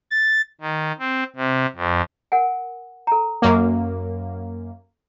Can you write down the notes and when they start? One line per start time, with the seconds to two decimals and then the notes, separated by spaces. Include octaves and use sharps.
0.11 A6
0.61 D#3
0.99 C4
1.36 C3
1.76 F2
2.32 A#4 F#5 G#5
3.07 A4 A#5
3.42 F#2 A#3